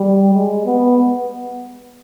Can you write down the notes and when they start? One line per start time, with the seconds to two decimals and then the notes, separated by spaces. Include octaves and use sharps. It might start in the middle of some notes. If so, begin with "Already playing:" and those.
Already playing: G3
0.35 G#3
0.65 B3